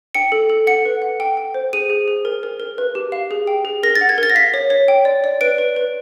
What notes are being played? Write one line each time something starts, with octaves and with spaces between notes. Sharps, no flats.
G5 C#7
A4
A4
F#5 C#7
B4
F#5
G5
G5
C5
G#4 D#7
G#4
G#4
A#4
A#4
A#4
B4
G4
F5
G#4
G5
G#4
A#4 A#6
A6
F#5
G#6
A#4 A6
A#6
F5 B6
C#5
C#5
G5
D5
D5
B4 D7
B4
B4